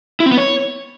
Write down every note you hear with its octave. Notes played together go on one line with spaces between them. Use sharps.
E4
C4
B3
C#5